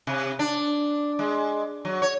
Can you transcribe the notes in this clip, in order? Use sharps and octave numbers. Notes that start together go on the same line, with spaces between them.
C3
D4
G#3
F#3
C#5